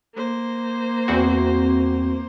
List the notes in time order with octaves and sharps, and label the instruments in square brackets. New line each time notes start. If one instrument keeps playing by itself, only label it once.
[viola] A#3 C5
[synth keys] E2 C4 F#4